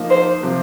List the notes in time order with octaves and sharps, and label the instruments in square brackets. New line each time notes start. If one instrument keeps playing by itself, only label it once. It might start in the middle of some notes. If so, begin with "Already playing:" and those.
Already playing: [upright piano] F3 A#3 D#4
[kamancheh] C5
[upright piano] C3 F3 C4